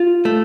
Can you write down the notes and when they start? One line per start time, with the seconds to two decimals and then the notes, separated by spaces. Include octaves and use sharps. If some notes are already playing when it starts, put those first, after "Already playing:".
Already playing: F4
0.25 A3